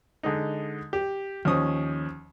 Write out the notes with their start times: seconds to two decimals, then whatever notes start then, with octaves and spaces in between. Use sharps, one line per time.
0.23 D3 G#3 D#4
0.93 G4
1.45 D#2 F3 C#4 D#6